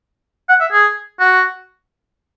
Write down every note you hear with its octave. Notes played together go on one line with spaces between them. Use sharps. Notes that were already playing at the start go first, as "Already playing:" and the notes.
F#5
E5
G#4
F#4